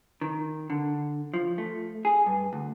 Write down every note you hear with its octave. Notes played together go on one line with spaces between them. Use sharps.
D#3
D3
F3
A3
G#4
G2
D2